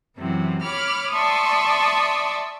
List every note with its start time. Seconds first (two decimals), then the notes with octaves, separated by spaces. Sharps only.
0.18 F#2 C3 E3 F#3
0.61 C#5 B5 D6 F6
1.12 D5 E5 A5 C6 C#6 D#6